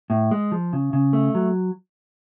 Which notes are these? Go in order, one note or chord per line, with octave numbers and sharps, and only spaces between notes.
A2
G#3
F3
C#3
C#3
A3
F#3